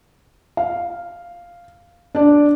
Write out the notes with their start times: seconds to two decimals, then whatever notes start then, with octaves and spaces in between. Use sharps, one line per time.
0.57 F5
2.15 D4 D5